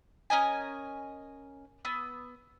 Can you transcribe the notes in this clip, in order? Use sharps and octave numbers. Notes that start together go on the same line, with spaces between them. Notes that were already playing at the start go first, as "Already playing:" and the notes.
C#4 A#4 D#5 G#5
B3 E6